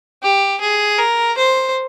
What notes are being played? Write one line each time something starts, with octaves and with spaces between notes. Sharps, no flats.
G4
G#4
A#4
C5